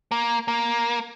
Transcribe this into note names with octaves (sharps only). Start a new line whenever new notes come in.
A#3
A#3